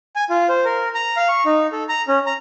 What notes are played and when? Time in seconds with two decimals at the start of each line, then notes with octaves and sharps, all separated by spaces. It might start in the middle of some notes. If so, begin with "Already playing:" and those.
0.16 G#5
0.30 F4
0.49 C5
0.65 A#4
0.95 A#5
1.17 F5
1.29 C#6
1.46 D#4
1.72 A4
1.89 A#5
2.08 C#4
2.26 A#5